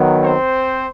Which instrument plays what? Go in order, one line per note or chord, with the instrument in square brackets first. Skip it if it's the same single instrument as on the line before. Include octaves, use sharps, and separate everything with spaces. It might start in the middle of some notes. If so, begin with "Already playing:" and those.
Already playing: [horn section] D#3 F#3 B3
C4 C5